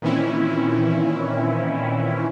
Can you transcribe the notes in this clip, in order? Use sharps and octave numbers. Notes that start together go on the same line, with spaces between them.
A#2 D#3 E3 C4 C#4 E4